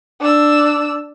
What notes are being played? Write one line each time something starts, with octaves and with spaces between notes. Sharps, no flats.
D4 E6